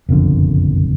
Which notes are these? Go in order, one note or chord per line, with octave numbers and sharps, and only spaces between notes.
F#1 B1 F2 D3